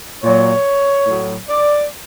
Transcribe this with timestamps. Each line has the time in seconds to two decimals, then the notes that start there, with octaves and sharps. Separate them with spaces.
0.23 A#2 F#3 C#5
1.07 A2 F#3
1.48 D5